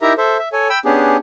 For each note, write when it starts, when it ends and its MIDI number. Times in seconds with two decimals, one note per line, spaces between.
0.01 0.13 63
0.01 0.13 64
0.01 0.13 67
0.01 0.13 70
0.01 0.13 76
0.01 0.13 82
0.18 0.37 69
0.18 0.37 72
0.18 0.37 76
0.39 0.49 76
0.53 0.68 69
0.53 0.68 73
0.53 0.68 80
0.70 0.79 79
0.70 0.79 83
0.70 0.79 88
0.85 1.17 59
0.85 1.17 61
0.85 1.17 62
0.85 1.17 67
0.85 1.17 68